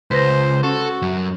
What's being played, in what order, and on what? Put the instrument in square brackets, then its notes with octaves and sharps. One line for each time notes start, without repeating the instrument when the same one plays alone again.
[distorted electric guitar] C#2 [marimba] B4 A#6 [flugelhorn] C5
[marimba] C#4 [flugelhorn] F#4 [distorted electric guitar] A4
[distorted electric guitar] F#2